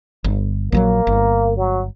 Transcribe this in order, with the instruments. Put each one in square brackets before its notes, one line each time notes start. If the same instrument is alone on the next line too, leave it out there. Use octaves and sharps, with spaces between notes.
[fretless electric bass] G1
[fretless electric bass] A#1 D#3 F#3 [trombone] A#3
[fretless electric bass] G1
[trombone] F#3